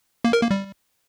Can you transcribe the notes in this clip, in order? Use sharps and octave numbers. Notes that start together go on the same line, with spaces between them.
A#3
A#4
A#3
G3